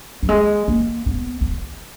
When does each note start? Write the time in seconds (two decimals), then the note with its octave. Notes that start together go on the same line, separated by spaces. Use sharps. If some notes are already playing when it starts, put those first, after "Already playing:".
0.23 F#3
0.29 G#3
0.68 A#3
1.06 B3
1.41 B3